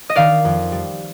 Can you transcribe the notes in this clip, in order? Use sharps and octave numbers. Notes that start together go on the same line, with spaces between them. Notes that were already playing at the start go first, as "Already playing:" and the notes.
D#5
D#3 D5 F5
F2
G3